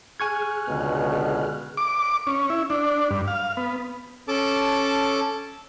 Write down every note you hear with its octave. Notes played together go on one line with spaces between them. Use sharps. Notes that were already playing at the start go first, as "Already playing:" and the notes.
G#4 G#5 C#6 F6 F#6 G#6
C#2 B2 D3
D6
C#4
E4
D4
G2
F5
B3
C#4 A4 A5 D6